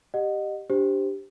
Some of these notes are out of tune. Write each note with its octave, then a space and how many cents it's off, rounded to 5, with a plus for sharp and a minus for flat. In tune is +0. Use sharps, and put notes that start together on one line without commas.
G4 +0 D#5 -20 F#5 +0
D4 +0 G4 +0 C5 +0